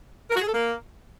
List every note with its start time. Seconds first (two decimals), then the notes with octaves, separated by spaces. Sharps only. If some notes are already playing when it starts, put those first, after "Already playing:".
0.30 A#4
0.36 F#4
0.42 G#4
0.47 A4
0.53 A#3